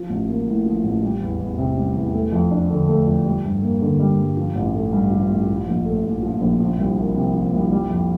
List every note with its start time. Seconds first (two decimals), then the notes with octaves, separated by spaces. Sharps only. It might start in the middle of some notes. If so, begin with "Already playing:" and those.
Already playing: F3
0.10 A1
0.28 A#3
0.47 A2
0.66 F3
0.84 A1
1.02 G3
1.21 E2
1.40 E2
1.58 C3
1.77 G3
1.95 E2
2.14 A3
2.32 F2
2.51 D4
2.70 D3
2.88 A3
3.07 F2
3.25 G3
3.44 G2
3.63 A#3
3.81 D3
3.99 G3
4.19 G2
4.37 F3
4.55 A1
4.74 A3
4.93 G2
5.11 F3
5.30 A1
5.49 F3
5.67 A#1
5.85 A3
6.05 A#2
6.23 F3
6.41 A#1
6.60 F3
6.78 C2
6.98 A#3
7.16 C3
7.35 F3
7.53 C2
7.72 G3
7.90 F2